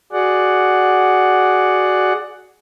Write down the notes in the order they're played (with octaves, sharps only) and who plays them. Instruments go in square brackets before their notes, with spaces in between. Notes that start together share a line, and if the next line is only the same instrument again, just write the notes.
[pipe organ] F#4 G#4 D5 F#5